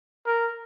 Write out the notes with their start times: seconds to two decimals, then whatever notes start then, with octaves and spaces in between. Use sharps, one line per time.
0.26 A#4